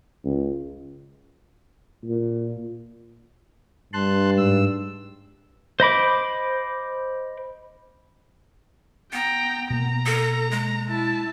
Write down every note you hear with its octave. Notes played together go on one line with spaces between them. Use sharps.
C#2
A#2
G2 A5 C6 F#6
G#2 E6
C5 D#5 B5 D6
B3 G5 A#5
B2 A#3 A#5
A4
G#3
E4 A5